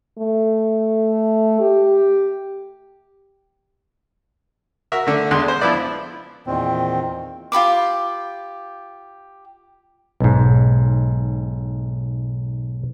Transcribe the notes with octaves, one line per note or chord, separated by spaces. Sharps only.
A3
G4
F#4 A#4 E5
D3 A3
E2 D3 G#3 C6 F#6
C5
F3 B3 E4 B4 D5
E2 A#2 D#3 C4
F4 G4 B5 D6
B1 G#2